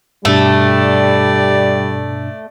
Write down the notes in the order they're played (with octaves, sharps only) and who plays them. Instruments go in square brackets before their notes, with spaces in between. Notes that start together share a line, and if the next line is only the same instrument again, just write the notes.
[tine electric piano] G2 B2 D4 [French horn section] G3 [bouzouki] A3 [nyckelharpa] D5